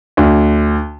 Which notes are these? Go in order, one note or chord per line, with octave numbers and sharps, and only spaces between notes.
D2